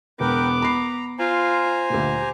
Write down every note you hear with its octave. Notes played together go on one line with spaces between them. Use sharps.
E1 B3 A#4 B4 G5 D6
A#5 B5 C7
F4 C5 G#5 A#5
D2 A#2 G4